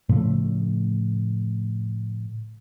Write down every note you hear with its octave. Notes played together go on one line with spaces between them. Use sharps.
A2 C#3 F3 A3